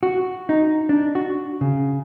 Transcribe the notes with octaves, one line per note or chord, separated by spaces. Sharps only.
F#4
D#4
D4
F#4
C#3